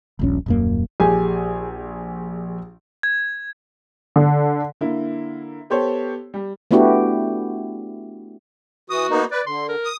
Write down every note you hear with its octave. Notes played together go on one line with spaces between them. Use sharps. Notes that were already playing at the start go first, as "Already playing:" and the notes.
D#1 A#1 C#4
D#1 F#2 A#3
A#1 G4 G#4 G#5
G#6
D3
D3 A#3 E4
B3 G4 A4 C5 C#5
G3
A3 B3 D4 E4 F#4 G4
E3 F#4 D#6
A#3 B3 D#4
B4 D5
D3 C6
A#4
D#6